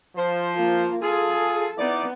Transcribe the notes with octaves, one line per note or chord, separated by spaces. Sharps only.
F3 C5
A#3 F4
F4 G#4 A4
B3 D#4 E4 D5